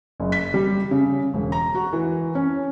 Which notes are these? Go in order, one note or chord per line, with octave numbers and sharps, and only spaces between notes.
F#1
B6
G3
C#3
E1
A#5
F#4
E3
C#4